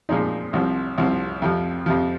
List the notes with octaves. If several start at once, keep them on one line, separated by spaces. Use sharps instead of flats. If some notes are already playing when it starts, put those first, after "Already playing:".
A#2 F3 G#3 C4 D#4
C2 C3 F3 C4
C2 C3 F3 C4
F2 C3 F3
F2 C3 F3